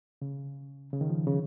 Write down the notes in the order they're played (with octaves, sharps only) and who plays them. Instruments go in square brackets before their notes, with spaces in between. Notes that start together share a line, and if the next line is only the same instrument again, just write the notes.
[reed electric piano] C#3
C#3
D#3
F3
C#3